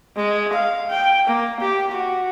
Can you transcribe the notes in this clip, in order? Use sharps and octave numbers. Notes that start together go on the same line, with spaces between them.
G#3
F5
G5
A#3
G4
F#4